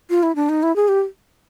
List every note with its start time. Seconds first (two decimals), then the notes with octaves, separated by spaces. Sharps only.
0.10 F4
0.23 E4
0.36 D4
0.49 D#4
0.63 E4
0.76 G#4
0.88 G4